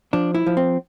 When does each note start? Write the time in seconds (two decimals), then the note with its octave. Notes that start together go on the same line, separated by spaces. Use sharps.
0.13 F3 D4
0.35 E4
0.46 F3
0.57 C4